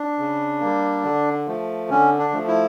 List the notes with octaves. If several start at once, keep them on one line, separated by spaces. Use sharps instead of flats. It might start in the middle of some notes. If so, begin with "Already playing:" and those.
Already playing: D4
C#3
G3 A#3
D3
F3 A3
D3 C#4
D4
F3 A3
E4